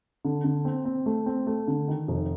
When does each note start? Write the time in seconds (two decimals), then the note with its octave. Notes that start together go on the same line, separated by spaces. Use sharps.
0.25 D3
0.44 D3
0.65 C4
0.85 C4
1.06 A3
1.26 C4
1.47 A3
1.68 D3
1.88 D#3
2.08 F1